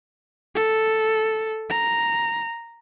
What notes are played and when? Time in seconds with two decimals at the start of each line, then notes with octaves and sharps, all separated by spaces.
0.55 A4
1.70 A#5